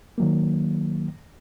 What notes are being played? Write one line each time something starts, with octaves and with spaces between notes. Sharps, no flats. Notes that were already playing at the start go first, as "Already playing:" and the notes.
D#3 F#3 A#3